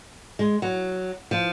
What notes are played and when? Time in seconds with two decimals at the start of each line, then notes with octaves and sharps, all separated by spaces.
0.39 G#3
0.62 F#3
1.31 F3